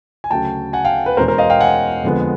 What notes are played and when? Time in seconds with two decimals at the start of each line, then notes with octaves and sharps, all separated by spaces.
0.24 G#5
0.31 D2 C#3 F#3 G5 A5
0.73 F#5 G#5
0.84 F5 G5
1.06 B4
1.17 E2 B2 G#3 C#4 A#4 C5
1.28 A#4 C5
1.38 D#5 F5
1.50 F5 G5
1.60 F#5 G#5
2.04 F2 D3 F3 G#3 B3